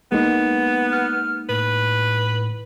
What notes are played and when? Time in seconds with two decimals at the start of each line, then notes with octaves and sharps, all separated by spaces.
0.12 G#3 A#3 B3 D#4
0.92 F6
1.49 A2 B4